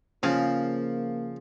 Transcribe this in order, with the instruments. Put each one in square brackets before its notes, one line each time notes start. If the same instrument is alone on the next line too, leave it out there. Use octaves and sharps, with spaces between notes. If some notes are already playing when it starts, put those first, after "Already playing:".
[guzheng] C#3 [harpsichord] F3 [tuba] A#3